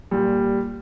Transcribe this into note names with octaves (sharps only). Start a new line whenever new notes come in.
A#2 G3